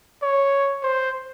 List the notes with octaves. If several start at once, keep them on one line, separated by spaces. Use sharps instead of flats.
C#5
C5